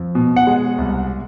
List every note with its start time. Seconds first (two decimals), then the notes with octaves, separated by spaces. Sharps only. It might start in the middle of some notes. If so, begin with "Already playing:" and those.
Already playing: F2
0.15 B2
0.36 F#5
0.47 G#3
0.78 C2